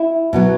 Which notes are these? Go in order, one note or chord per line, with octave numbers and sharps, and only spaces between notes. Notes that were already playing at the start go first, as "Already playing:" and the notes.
Already playing: E4
B2 F#3 B3